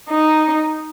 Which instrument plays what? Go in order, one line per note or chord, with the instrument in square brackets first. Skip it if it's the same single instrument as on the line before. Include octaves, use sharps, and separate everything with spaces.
[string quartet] D#4